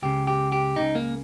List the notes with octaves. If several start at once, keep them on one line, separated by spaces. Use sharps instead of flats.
C#2 C#3 G4
G4
G4
C#2 C#3 D#4
A#3